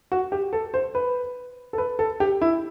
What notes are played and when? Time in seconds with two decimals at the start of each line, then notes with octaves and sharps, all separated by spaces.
0.12 F#4
0.32 G4
0.53 A4
0.74 C5
0.95 B4
1.73 A4
1.78 B4
1.99 A4
2.20 G4
2.42 E4